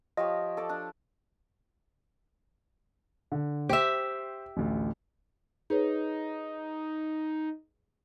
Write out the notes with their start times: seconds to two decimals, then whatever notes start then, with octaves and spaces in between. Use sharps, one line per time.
0.17 F3 G4 C#5 D#5
0.57 A4 D5 A5
0.69 D4
3.32 D3
3.69 G4 C5 E5
4.57 A1 D2
5.70 D#4 G#4 B4 C#5